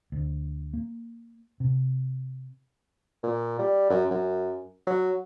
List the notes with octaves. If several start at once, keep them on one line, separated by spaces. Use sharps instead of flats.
D2
A#3
C3
A#2
G3
F#2
F#2
F#3